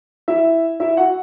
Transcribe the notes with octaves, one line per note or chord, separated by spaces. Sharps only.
E4 E5
E4 E5
F#4 F#5